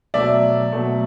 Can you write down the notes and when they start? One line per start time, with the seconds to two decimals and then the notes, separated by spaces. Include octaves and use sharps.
0.14 B2 F#3 A3 D5 E5
0.72 B2 F#3 A3